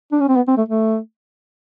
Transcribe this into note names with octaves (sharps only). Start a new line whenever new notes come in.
D4
C#4
C4
B3
C4
A3
A3